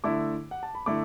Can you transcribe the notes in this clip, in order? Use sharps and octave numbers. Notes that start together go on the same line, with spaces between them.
D3 A3 E4 D6
F#5
A5
B5
D3 A3 E4 D6